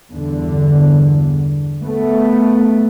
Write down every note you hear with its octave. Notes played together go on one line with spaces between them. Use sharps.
E2 G2 D3
A3 B3